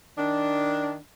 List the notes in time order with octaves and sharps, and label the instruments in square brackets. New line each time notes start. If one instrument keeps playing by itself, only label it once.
[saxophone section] D#3 D4